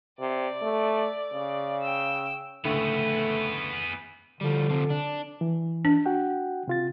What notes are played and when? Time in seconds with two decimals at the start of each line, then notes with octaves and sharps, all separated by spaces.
0.20 C3 D5
0.62 A3
1.33 C#3
1.82 G5 E6
2.65 C#2 A2 D3 A3 B3 G#4
4.41 D3 F3 G3
4.70 C3 F3
4.90 D4
5.41 E3
5.85 D4
6.06 F#4 F#5 G5
6.68 C3 F4 A6